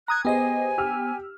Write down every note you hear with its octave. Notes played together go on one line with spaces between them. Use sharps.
A#5 D#6 F#6 G#6
B3 G4 G#4 C5 D#5 G#5
G4 E6 F6